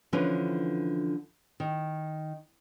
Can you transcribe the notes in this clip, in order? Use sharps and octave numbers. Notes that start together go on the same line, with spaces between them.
D3 E3 F3 C#4 D4 B4
D#3